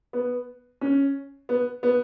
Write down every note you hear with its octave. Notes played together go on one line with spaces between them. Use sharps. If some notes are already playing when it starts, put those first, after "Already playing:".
B3
C#4
B3
B3